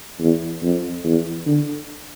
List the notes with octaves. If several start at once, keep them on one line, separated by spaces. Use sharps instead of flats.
E2
F2
E2
D3